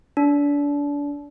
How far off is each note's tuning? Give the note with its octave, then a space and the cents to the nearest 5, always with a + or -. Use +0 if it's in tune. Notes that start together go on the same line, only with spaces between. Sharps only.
D4 -30